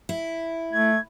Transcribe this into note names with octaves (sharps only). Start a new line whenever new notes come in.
E4
A3 G#6